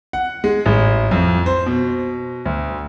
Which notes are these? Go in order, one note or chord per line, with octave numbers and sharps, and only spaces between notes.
F#5
G#3
A1
F2
C5
B2
D2